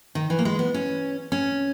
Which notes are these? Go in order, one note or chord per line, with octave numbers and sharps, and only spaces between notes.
D#3
E3
A#3
G#3
B3
C#4
C#4